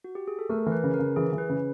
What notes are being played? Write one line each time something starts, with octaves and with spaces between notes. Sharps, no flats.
F#4
G4
G#4
A4
A3 A#4
E3 A#4
B4
C#3
A#4
C#3
E3 G#4
E3
B4
C#3